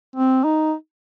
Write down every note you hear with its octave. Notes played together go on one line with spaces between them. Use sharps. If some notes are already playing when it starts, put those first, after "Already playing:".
C4
D#4